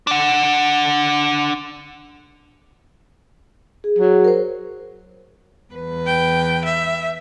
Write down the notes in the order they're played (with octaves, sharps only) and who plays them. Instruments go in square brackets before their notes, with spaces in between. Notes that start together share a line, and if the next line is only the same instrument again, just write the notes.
[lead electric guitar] D4 F#5
[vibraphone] G#4
[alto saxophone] F#3
[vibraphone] A#4 C5
[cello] E2 B4
[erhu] G5
E5